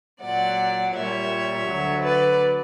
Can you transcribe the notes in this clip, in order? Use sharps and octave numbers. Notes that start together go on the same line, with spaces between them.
A#2 F#3 D5 F#5
A#2 G3 C#5 E5
D2 D3 F#3
B4 D5